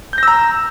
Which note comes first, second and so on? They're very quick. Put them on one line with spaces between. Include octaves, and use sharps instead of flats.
G6 A#6 E6 A#5